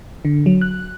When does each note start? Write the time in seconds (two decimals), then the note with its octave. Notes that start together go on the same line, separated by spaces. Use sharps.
0.25 D3
0.46 F#3
0.61 F#6